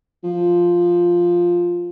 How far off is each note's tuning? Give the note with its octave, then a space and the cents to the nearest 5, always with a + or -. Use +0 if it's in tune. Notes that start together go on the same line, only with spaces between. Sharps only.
F3 +0